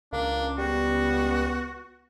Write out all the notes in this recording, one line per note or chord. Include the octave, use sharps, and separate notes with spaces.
C#2 A#3 D4
G3 B3 F#4